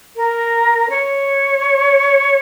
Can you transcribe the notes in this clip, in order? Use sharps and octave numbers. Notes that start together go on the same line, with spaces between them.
A#4
C#5